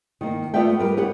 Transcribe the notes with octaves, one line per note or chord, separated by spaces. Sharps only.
D#3 A#3
A3 B3 F4 D5 E5 G5
G3 A#4 B4
B3 G4 C#5 F#5